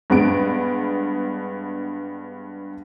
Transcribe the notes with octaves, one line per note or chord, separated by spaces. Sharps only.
G2 G#3 B3 D7